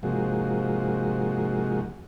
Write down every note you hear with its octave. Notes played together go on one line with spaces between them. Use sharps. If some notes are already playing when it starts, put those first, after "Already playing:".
G#2 C3 F3 G#3 A#3 F#4